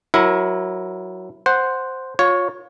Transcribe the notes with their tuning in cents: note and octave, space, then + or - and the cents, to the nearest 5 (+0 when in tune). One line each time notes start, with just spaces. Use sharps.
F#3 +0 E4 +0 A#4 +25
C5 +0 F#5 +0
F4 +30 C#5 +0